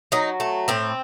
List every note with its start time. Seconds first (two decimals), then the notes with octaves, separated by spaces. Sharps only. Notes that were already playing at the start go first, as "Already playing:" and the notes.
0.12 F#3 D#4
0.40 A3
0.68 A2 C4